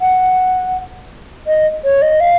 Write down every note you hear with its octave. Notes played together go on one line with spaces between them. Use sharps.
F#5
D#5
C#5
D#5
F5